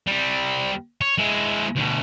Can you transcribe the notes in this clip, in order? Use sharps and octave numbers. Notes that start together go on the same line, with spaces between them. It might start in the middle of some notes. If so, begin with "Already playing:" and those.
G3 C4
C#5
G#3 E4
D2 B2